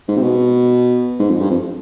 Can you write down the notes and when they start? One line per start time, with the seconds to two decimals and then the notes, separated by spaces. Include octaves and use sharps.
0.08 G#2
0.17 C3
0.23 B2
1.19 G#2
1.30 F2
1.40 G2
1.50 F2